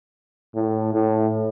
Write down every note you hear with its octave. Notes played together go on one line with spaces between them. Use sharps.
A2
A2